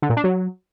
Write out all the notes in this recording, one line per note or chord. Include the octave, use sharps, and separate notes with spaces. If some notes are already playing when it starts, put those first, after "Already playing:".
D3
A#2
D4
F#3